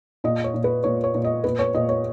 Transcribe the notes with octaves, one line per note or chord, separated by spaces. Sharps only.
A#2 D#5
C#5
A#2
B4
A#2 C#5
C#5
A#2
D#5
A#2 B4
C#5
A#2 D#5
C#5